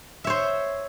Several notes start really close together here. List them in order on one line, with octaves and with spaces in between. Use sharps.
E5 C#5 C5